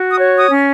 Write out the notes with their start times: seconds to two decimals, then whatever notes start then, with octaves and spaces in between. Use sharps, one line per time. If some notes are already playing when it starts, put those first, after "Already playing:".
Already playing: F#4
0.10 D#6
0.19 C#5
0.37 D#6
0.51 C#4